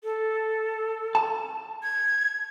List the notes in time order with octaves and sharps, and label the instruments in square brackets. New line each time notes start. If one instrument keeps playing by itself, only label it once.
[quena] A4
[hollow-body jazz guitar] A5
[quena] G#6